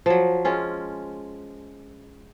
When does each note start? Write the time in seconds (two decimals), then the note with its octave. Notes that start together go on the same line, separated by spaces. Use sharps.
0.06 F3 F#3
0.45 G#3 C#4 F4